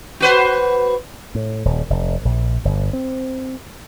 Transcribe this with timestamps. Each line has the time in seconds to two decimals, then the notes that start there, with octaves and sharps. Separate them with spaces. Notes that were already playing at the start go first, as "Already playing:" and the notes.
0.20 F#4 B4 C5
1.35 A2
1.65 D#1
1.90 F1
2.25 A#1
2.65 G1
2.93 C4